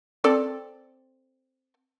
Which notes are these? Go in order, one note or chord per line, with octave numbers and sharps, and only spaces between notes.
C4 A4 D5